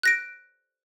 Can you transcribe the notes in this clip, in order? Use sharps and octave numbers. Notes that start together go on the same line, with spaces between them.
F#6 A#6 D7